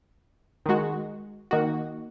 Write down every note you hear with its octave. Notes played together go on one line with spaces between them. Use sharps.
D#3 G#3 F#4
D#3 A#3 D#4 F#4